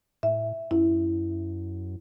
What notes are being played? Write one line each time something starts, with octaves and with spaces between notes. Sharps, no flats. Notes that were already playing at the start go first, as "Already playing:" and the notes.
A2 E5
F#2 E4